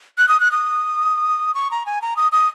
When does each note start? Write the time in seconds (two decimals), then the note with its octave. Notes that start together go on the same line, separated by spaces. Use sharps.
0.18 F#6
0.29 D#6
0.40 F#6
0.51 D#6
1.55 C#6
1.71 A#5
1.86 G#5
2.02 A#5
2.17 D#6
2.32 D#6